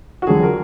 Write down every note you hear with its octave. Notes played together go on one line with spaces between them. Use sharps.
F#4
F2 D3 F#3 G#4
A#4